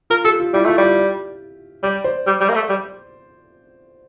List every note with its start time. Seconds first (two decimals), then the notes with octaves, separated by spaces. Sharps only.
0.10 F4 A#4
0.25 G4 A4
0.40 F4
0.54 G3 E4
0.66 A3 F4
0.78 G3
0.83 G4
1.83 G3 D5
2.04 C5
2.27 G3
2.41 G3
2.49 A#3
2.55 A3
2.70 G3